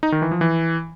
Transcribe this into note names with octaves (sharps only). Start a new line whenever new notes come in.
D#4
D#3
E3
F3
E3